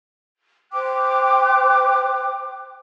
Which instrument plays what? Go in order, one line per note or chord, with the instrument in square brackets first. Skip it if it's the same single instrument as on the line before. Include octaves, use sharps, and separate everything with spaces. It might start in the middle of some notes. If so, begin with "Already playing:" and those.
[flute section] C5 G5 D6 F#6